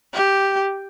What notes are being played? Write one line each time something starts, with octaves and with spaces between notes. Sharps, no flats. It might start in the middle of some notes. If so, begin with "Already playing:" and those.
G4